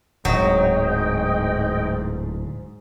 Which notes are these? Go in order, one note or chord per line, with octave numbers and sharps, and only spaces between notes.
D1 G#2 F#3 D#5 G5